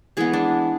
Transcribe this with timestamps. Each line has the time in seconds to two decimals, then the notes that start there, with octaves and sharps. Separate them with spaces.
0.17 E3 G#3 B3 G#4
0.33 D4